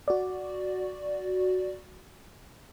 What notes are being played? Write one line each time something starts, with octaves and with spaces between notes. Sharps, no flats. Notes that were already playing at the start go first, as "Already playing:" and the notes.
F#4 D5